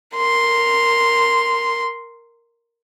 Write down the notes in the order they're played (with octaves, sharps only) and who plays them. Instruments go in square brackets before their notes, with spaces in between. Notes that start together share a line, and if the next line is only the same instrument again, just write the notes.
[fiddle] A#4 C6